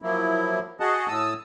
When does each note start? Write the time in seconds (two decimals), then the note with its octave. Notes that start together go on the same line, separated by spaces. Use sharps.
0.02 F3 F#3 A#3 E4
0.80 F#4 G#4 D#5 F#5 A5
1.08 A2 A5 D#6 E6